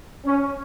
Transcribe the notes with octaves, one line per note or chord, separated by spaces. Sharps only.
C#4